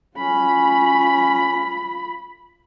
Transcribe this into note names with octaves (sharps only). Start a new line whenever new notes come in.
C#4 F4 B5